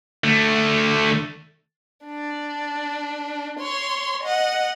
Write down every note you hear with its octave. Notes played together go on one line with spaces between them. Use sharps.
D3 A3
D4
C#5 C6
D#5 F#5